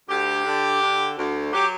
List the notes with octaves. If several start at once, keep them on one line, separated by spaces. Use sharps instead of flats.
D2 G4
D3
D3
D2
F#3 G4